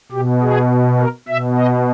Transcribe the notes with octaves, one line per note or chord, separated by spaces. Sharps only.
B2 G4
G#4
A#4
B2 E5
D#5